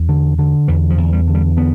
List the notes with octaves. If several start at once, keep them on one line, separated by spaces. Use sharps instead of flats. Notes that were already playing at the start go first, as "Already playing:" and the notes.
Already playing: E2
D3
D3
E2 E3
F3
E2
G3
D3
G3
D3 B3